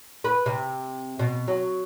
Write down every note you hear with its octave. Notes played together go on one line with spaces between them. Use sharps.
B4
C3
B2
F#3